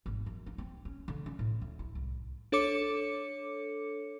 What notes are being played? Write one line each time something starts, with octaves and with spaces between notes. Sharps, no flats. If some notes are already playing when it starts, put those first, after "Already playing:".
G#1
F#2
D4
C4
C#4
D3
C#4
A2
D2
E4
C2
D4 A4 C#5 D6 C#7